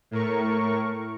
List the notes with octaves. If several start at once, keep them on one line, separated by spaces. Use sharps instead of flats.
A2 A#4 C#6